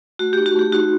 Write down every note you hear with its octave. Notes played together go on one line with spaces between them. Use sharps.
A3 F#4
D#4 G4
F#4
A3 G4
D#4 F#4